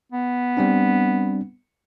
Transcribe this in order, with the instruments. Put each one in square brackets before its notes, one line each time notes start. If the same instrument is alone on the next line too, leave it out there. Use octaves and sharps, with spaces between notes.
[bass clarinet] B3
[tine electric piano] G3 C4 D4